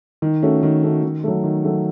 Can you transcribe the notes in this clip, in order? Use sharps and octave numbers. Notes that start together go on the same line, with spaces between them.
D#3
A3 C#4 F#4
D#3
A3 C#4 F#4
D#3
F#3 A3
D#3
F#3 A3